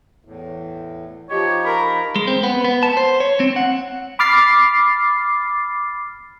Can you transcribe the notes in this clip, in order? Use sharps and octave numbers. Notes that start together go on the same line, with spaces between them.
E2 A2
F3 D#4 G4 C#5
A#4 B5
G#3
C4
B3
B3
A5
C5
C#5
C4
F#5
B5 D6 F6 A6 C7